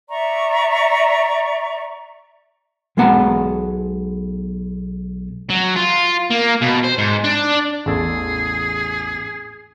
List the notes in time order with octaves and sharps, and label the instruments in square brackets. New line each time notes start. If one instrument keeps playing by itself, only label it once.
[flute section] D5 E5 A#5 C#6
[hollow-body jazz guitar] B1 G#3 B3 F#5 A5 A#5
[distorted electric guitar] F#3
F4
A#3
B2
C5
G#2
D4
[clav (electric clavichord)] A1 E2 A4 [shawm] G#4